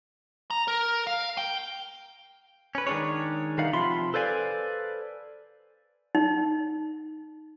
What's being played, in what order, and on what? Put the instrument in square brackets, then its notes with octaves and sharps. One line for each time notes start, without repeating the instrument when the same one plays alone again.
[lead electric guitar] A#5
A#4
F5
G5
[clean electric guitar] C#4 B4
D#3 G#3 D4 G#4 C#5
D#3 E3 G3 D#4 F5 F#5
C3 F3 F4 E5 B5 C6
A4 B4 C5 D5 F5 G#5
[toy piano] D#4